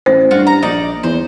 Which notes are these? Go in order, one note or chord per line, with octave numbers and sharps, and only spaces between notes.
A1 C5
G2 F4 F#4
A#5
A#1 D#4 D5
E2 C5